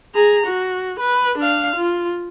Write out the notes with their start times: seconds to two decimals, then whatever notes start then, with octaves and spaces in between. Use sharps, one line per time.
0.15 G#4 A#5
0.47 F#4
1.00 B4
1.39 D4 F5
1.76 F4